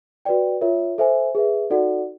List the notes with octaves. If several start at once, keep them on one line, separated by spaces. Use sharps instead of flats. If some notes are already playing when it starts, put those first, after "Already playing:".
F#4 B4 D5 G5
F4 A#4 C#5 E5
A4 C5 E5 G#5
G#4 B4 E5
D#4 F#4 A4 D5 F#5